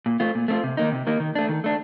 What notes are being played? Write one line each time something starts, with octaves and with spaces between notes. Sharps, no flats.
A#2
A3 C4 F4
A#2
A3 C4 F4
C3
D#3 A#3 D#4
C3
D#3 A#3 D#4
D#3
A3 D4
D#3
A3 D4